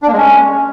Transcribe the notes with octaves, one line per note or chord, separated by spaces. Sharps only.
D4
A#3
G#3
C#4